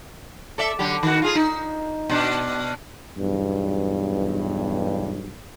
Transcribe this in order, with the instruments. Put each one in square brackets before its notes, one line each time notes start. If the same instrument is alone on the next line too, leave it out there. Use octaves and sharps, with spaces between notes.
[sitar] A4 D5 E5
D3 F#3 G4
D#3 F#4
F4 G#4
D#4
B2 D4
[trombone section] B1 E2 G2